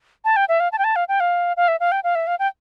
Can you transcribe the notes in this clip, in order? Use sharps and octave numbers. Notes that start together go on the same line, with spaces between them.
A5
G5
E5
F5
A5
G5
A5
F5
G5
F5
F5
E5
F5
G5
F5
E5
F5
G5